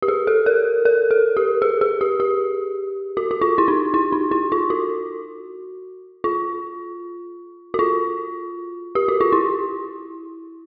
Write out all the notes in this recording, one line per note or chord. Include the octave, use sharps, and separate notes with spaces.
G4
G#4
A4
A#4
A#4
A4
G4
G#4
G#4
G4
G4
F#4
F#4
F4
E4
D#4
E4
D#4
E4
F4
F#4
F4
F#4
F4
G4
F#4
F4
E4